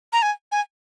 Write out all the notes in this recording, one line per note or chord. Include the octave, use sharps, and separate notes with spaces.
A#5
G#5
G#5